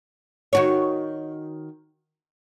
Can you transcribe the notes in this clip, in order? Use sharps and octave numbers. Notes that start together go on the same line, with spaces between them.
D#3 F#4 C#5